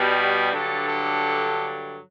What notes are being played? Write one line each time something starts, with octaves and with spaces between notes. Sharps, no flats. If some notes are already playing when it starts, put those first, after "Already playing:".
Already playing: B2 G3
G2 D3 F#3 A4
A4